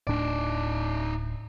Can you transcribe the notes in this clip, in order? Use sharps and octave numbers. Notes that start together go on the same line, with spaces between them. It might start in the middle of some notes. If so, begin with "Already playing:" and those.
D1 A2 D4 D#4 D5